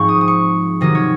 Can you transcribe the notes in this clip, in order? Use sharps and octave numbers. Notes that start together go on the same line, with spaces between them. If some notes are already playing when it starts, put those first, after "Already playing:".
Already playing: G#2 F3 G#3 C4 C#6
D#6
D#6
C#6
C3 D#3 F#3 D#5
C#5